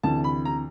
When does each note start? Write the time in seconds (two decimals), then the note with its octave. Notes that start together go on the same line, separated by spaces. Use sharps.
0.03 D2 C3 E3 A5
0.24 B5
0.45 A#5